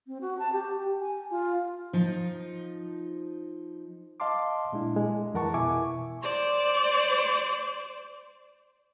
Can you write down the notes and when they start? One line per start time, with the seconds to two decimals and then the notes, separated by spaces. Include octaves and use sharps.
0.07 C4
0.21 F#4
0.39 A5
0.53 G4
1.01 G#5
1.31 F4
1.93 F3 D#4
4.20 D#5 F5 A5 C6 D6
4.72 A#2 G#3 D4 E4
4.97 G#3
5.34 F2 E3 A#4 F#5 A5 C#6
5.54 B2 E4 E5 G#5 C#6 D6
6.23 C5 D5